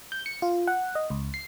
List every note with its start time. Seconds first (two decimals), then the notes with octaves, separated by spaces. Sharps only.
0.12 G6
0.26 C#7
0.42 F4
0.67 F#5
0.95 D#5
1.10 C#2
1.34 C7